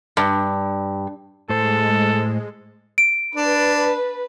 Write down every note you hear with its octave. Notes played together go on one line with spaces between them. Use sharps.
G2
A2 G#3 A4 C5
D7
D4 B4